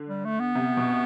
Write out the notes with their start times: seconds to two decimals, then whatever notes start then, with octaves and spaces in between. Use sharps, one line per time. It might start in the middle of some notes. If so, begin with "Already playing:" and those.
Already playing: D3
0.09 G3
0.25 A3
0.40 B3
0.55 C3
0.77 B2